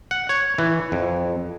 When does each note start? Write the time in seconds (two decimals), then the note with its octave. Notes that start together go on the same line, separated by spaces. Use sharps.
0.11 F#5
0.29 C#5
0.58 E3
0.92 F2